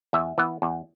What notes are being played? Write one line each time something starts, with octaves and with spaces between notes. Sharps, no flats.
E2 E5
E3 B3
E2